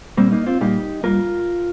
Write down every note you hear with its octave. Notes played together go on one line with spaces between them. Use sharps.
A#2 G3 A#3 C4
A#3 D#4
C4 F4
A#2 G3 A#3 D#4 G4
G2 G3 A#3 F4 A#4